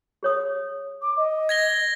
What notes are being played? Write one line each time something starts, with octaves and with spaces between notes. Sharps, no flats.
G#4 C#5 D#6
D6
D#5
G#6 A#6 G7